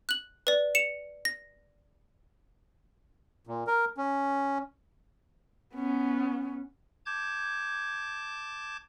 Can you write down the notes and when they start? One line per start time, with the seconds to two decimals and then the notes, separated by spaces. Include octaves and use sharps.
0.09 F#6 F#7
0.47 B4 D5
0.75 C#7 E7 F7
1.25 A#6
3.47 A#2
3.67 A#4
3.97 C#4
5.74 B3 C#4
7.06 A5 D6 G6 G#6